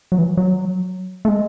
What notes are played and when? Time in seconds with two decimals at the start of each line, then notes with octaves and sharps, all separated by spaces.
0.12 F#3
0.18 E3
0.37 F#3
1.25 A3
1.28 G#3